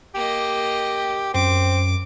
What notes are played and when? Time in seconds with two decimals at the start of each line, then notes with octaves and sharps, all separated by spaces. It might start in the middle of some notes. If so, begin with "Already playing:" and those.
0.15 A#3 G4 D#5
1.34 F#2 C4 D6